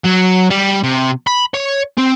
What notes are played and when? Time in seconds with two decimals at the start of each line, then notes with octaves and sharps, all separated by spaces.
0.05 F#3
0.50 G3
0.83 C3
1.27 B5
1.54 C#5
1.98 C4